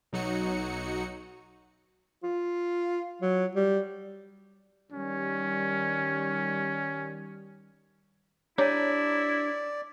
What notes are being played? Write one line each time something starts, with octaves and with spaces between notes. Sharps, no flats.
B1 F#3 D#4 F#4 C#7
F4
F#3
G3
D#3 G3 C#4
D4 E4 G4 C#5 D5 A5 A#5